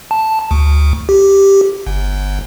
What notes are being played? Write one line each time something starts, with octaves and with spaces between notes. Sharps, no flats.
A5
D2
G4
G1